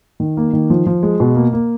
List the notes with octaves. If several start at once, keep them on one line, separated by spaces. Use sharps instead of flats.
D#3
A#3
D#3
F3
F3
G#3
B2
A#3
A#3